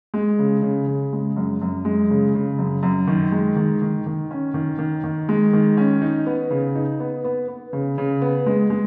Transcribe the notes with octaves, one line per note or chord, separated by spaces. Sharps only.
G#3
C#3
C#3
C#3
G#3
F#2
F#2
G#3
C#3
C#3
F#2
F#2
D#3
G#3
D#3
D#3
D#3
C#4
D#3
D#3
D#3
G#3
D#3
C#4
D#4
B3
C#3
D#4
B3
B3
B3
C#3
C#3
B3
G#3
G#3